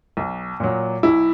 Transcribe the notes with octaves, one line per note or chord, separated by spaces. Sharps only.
B1
A#2 F#3
B1 E4